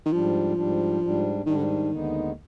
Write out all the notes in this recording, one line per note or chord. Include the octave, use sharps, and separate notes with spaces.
D#3
G#2 F3 G3 D4
G#2 G3 D4
G#2 G3 D4
G#2 D#3 G3 D4
D3
D#3
D#2 D3 G#3 B3 D#4